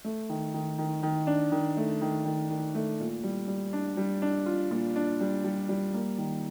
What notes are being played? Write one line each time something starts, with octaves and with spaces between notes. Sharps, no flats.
A3
D#3
D#3
D#3
D#3
D4
D#3
A3
D#3
D#3
D#3
A3
A#2
G3
G3
D4
G3
D4
F4
A#2
D4
G3
G3
G3
A#3
D#3